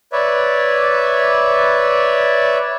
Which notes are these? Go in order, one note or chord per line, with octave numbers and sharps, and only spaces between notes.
B4 C#5 D5 E5